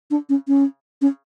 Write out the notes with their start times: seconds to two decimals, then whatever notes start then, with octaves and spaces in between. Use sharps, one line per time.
0.11 D4
0.29 C#4
0.48 C#4
1.02 C#4